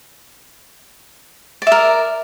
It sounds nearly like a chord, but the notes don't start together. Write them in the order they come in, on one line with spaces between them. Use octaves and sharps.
D5 E5 A#4